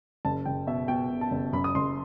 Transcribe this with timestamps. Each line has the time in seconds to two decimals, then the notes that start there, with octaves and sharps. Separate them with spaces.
0.25 F#1 A5
0.45 F#1 G5
0.67 B2 E5
0.88 B2 G5
1.10 B2
1.21 A5
1.31 F#1
1.53 F#2 B5
1.64 D#6
1.75 F#1 C6